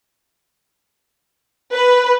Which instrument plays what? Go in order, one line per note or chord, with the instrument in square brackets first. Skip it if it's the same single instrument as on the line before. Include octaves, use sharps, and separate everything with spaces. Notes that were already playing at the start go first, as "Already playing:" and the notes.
[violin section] B4